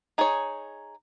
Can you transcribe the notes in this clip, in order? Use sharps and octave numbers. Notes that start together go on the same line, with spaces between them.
D#4 G#4 C#5